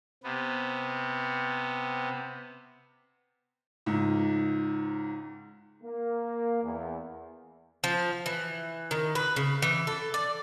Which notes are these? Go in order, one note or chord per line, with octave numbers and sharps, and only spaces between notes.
C3 B3
C#2 G#2
A#3
E2
F3
E3
D#3
B4
C#3
E3
A4
D5